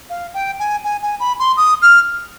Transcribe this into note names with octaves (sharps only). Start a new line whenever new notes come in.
F5
G5
G#5
G#5
G#5
B5
C6
D#6
F6